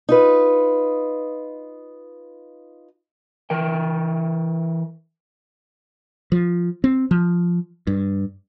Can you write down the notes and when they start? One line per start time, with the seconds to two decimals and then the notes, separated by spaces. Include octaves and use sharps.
0.09 D#4 F4 B4
3.50 E3 A#4 G5
6.32 F3
6.84 C4
7.11 F3
7.87 G2